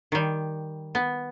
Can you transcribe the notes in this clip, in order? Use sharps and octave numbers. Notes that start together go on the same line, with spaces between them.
D#3 G3
B3